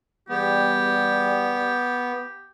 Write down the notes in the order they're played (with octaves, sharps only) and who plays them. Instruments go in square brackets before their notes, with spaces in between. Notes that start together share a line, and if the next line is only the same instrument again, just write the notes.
[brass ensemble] E2 G3 [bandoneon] B3 [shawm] G4